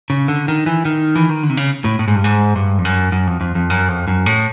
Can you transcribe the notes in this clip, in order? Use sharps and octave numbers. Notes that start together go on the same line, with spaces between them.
C#3
D3
D#3
E3
D#3
E3
D#3
D3
C3
C#3
A2
A2
G#2
G2
G#2
G2
F2
F#2
F#2
F2
F2
F2
F#2
F2
F#2
A2